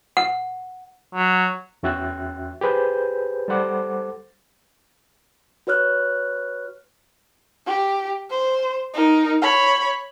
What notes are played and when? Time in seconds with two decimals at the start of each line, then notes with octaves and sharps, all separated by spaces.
0.17 F#5
1.15 F#3
1.83 E2 C#4 F#4 E5 G5 F#6
2.61 G4 G#4 B4 C5 G6
3.48 G3 A4 C5 F#5 D6
5.67 F#4 B4 C#5 F6 F#6
7.67 G4
8.31 C5
8.94 D#4 A#4
9.42 C#5 B5